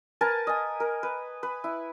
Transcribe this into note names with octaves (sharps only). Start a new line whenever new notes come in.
A#4 B4 G#5 A5
D#5 G#5
A#4
B4
B4
E4